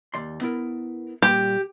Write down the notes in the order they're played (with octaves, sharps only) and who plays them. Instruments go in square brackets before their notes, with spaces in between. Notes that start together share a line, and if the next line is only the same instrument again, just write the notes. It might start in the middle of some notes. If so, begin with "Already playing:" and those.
[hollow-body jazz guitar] D#2 D5 C6
B3 E4 A#4
[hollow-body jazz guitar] A#2 G3 A#3 [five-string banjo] G4